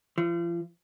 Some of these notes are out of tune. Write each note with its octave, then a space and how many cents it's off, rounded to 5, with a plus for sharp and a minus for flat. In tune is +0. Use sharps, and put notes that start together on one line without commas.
F3 -40